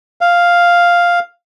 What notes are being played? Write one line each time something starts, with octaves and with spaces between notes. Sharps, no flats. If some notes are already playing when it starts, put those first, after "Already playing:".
F5